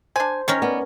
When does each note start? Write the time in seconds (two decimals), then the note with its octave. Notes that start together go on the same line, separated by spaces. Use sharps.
0.16 D4 C5 G#5
0.48 D#3 C#4 A#4 C#5
0.62 B3 D5